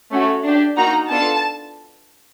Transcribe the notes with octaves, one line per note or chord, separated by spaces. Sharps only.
A3 C#4 F#4
D4 G4
A#3 D#4 F#4 A#5
B3 D4 F4 A4 A5